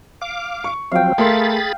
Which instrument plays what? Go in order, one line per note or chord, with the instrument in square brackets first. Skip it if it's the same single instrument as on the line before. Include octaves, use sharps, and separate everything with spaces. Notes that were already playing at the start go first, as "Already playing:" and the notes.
[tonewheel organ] F5 D6
[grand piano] C#6
[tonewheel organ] F3 F#3 C4 [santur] F5 G5
[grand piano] A3 A#4 C6 [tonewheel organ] G#4 B5 A6